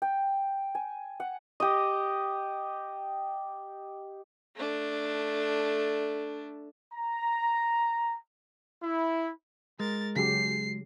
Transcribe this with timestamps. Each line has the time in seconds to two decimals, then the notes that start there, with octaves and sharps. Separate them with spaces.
0.02 G5
0.75 G#5
1.20 F#5
1.60 G4 D#5
4.56 A3 D4
6.92 A#5
8.82 E4
9.80 G#3 A#4 A6
10.16 C#3 F#3 G4 C7